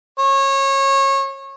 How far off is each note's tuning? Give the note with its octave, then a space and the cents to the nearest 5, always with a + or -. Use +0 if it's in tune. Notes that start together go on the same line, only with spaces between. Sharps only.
C#5 -25